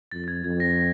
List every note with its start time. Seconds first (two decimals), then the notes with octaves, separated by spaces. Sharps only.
0.12 F2 A6
0.24 A6
0.28 G#6
0.44 F2 G#6
0.60 A#6
0.77 A#6